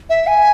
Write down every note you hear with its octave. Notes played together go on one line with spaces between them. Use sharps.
E5
G#5